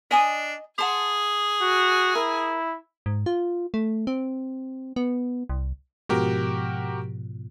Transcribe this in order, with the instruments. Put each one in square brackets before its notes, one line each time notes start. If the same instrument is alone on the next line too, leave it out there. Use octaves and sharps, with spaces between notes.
[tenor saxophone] D4 [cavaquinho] D#5 G#5 D#6
[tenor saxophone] G#4 [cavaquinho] F#5 A5 C6
[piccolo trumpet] F#4
[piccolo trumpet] E4 [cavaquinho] A#4
[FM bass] G#2
F4
A3
C4
B3
C2
[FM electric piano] G#2 B2 F3 [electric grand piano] F#4 G4 A#4